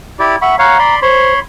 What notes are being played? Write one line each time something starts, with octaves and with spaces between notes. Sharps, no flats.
E4 G4 D5
E5 F#5 B5 C#6
C#5 F5 F#5 A#5
D5 B5 C6
C5 C#5 B5 C6